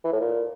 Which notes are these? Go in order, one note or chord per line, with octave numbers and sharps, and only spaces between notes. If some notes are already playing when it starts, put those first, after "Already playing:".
E3
A2
A#2